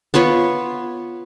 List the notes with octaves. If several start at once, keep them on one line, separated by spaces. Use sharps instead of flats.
B3 F4 B4 C#5